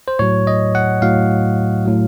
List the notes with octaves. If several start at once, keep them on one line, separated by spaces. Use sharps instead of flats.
C5
A2 F#3 C#5
D#5
F#5
A2 F#3 F5
A2 F#3